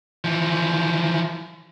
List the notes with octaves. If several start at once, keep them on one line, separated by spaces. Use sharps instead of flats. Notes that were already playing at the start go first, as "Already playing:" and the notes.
E3 F3